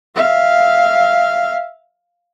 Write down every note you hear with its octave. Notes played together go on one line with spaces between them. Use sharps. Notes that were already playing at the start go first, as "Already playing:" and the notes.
E5 F5